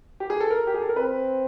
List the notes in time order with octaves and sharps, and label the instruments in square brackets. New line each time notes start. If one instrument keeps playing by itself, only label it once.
[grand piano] G4
G#4
A4
A#4
G4
G#4
A4
A#4
[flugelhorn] C4 [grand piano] B4